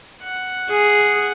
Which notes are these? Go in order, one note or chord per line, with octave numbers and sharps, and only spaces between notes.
F#5
G#4